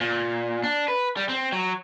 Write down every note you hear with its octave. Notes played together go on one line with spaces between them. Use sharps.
A#2
D4
B4
G3
C4
F#3